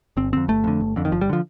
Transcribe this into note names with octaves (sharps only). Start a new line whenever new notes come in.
G1 C4
F2 D3 C4
G1 A3
F2 D3
G1
F2 D3
D#3
G1 F3
G3
D3 F3